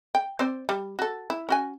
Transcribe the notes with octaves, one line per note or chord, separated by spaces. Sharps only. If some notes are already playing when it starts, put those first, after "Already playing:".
G5
C4 C5 D5
G3
F#4 A4
E4
C#4 F#4 G#5